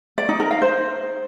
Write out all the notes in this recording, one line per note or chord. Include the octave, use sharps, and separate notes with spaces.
D5
D#4
A#4
F5
C5